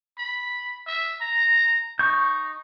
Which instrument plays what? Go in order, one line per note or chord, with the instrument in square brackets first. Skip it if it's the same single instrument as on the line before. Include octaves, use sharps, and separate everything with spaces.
[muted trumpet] B5
E5
A#5
[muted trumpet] D#4 [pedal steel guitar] C#6 G6